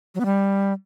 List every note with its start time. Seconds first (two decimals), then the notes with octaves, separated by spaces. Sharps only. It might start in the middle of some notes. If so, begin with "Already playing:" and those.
0.15 F#3
0.20 B3
0.25 G3